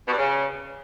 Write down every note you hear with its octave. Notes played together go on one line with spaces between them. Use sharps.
B2
G2
C#3